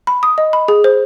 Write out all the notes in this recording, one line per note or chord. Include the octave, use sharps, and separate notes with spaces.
B5
D#6
D#5
B5
G#4
C5